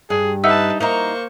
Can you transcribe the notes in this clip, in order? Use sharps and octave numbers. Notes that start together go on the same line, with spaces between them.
G2 G#4
D#4 B4 E5 F#5 A5 E6
A#3 D#4 E4 A#4 C5 C#6